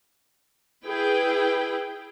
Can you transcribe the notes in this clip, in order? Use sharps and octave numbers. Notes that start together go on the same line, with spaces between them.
E4 G#4 B4 G5